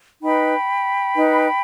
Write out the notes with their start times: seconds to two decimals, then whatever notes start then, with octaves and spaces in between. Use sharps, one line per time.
0.22 D#4 B4 G5 B5
1.15 D#4 B4